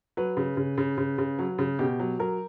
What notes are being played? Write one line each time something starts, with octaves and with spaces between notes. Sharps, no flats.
F#3 B4
C#3
C#3
C#3
C#3
C#3
F#3
C#3
B2 G4
F#3
F#3 A#4